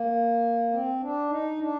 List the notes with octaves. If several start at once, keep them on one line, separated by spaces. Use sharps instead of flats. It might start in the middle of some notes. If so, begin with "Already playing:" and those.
Already playing: A#3
C4
D4
D#4
D4